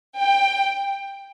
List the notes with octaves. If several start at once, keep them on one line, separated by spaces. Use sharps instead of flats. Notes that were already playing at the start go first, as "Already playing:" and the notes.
G5